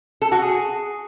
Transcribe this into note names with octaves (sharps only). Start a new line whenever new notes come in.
A4
F#4
G#4